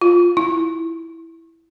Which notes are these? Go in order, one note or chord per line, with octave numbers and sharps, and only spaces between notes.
F4
E4